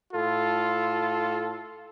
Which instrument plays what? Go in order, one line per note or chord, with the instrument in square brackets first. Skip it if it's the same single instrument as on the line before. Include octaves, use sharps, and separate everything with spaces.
[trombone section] A2 F4 A4